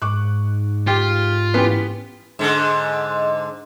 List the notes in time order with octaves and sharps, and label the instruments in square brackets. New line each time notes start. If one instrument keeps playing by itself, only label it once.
[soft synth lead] G#2 [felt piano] C#6 D6 F#6
[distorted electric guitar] F4 [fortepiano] G4
[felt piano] E3 C#4 B6 [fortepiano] B3 G4
[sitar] G#2 D3